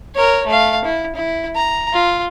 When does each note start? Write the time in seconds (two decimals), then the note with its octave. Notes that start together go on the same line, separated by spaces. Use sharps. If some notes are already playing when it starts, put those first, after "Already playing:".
0.15 A#4 C#5
0.47 A3 F5
0.85 E4
1.16 E4
1.55 A#5
1.93 F4